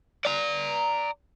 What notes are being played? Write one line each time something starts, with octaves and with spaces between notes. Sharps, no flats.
D5 A#5